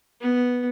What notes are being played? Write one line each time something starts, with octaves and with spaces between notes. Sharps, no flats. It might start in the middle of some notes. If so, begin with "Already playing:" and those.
B3